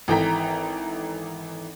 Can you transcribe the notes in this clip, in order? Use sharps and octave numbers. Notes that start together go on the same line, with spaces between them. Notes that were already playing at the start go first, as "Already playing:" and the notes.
G#1 E3 A4 G5 A#5 B6